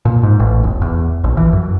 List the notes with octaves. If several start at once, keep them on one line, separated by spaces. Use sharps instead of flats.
A#2
G#2
A1
E1
E2
A#1
E3
F#2